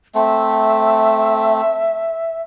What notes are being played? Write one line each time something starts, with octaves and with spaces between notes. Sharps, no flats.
A3 C4 E5